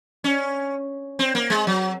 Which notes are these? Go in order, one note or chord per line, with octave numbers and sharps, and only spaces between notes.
C#4
C4
A#3
G#3
F#3